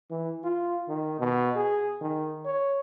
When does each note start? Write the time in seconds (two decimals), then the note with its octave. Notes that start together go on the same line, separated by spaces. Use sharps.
0.10 E3
0.44 F4
0.88 D#3
1.19 B2
1.56 G#4
2.01 D#3
2.45 C#5